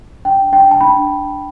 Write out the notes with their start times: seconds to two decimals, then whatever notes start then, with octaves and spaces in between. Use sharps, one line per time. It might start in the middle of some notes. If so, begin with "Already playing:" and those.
0.25 D4 G5
0.52 D4 G5
0.71 A5
0.81 D4 B5